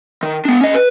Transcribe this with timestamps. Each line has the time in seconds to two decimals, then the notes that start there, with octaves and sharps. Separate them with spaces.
0.23 D#3
0.45 B3 D4
0.61 C#4 D#5
0.75 B4